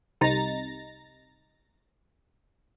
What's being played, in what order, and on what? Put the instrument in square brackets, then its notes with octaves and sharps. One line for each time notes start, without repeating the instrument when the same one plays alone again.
[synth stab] C2 C3 D#4 A#5 A6 A#6